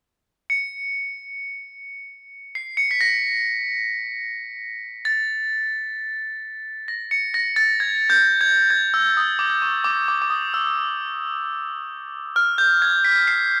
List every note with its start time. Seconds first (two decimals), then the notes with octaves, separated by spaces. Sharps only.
0.50 C#7
2.55 C7
2.77 C#7
2.91 B6
3.01 A#6
5.05 A6
6.88 A#6
7.11 C#7
7.34 A#6
7.56 A6
7.80 G#6
8.10 G6
8.41 G#6
8.70 G#6
8.94 E6
9.17 D#6
9.39 D6
9.62 C#6
9.84 D6
10.08 D6
10.22 D6
10.30 D#6
10.54 E6
12.36 F6
12.58 G6
12.82 G#6
13.05 B6
13.27 C7